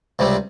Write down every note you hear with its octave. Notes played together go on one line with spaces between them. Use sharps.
C#2 C3 G3 C4